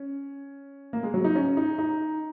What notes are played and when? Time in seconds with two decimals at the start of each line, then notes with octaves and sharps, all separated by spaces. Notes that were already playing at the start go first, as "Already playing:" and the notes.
Already playing: C#4
0.93 A#3
1.03 G#3
1.14 F#3
1.24 D#4
1.35 C#4
1.57 D#4
1.78 D#4